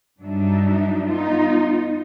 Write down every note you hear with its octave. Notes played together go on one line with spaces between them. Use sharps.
G2 F#3 D4 D#4 E5
B3 D#4 F4